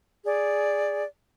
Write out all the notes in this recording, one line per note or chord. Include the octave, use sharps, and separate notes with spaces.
G#4 D5